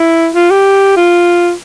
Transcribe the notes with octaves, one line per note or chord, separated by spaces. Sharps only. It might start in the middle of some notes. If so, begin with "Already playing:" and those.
Already playing: E4
F4
G4
F4